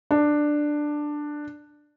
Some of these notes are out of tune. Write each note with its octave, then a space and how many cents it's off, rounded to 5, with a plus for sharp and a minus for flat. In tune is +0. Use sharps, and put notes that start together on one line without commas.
D4 +10